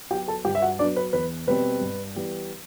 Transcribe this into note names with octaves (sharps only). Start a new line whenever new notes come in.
F#3 B3 G4 G5
A4 A5
G2 G4 G5
E5
F#4 F#5
F#3 B3 D4 D5
B4
E2 B4
B2 G3 C4 B4
G2
E3 G3 B3